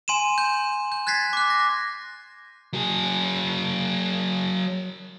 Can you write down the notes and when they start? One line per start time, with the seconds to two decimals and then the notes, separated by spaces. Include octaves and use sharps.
0.08 G#5 C6 D#7 E7
0.38 G6
0.92 G6
1.07 F#6 G#6 A6 B6 C7
1.33 D6 F#6
1.50 A#6
2.73 F#3 G#4